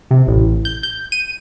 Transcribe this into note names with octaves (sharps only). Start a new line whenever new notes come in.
C3
A1
G6
G6
D#7